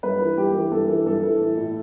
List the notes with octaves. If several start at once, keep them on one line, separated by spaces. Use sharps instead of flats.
G2 B4
E3
G2 G4
E3
G2 A4
E3
G2 A4
E3
A2
A2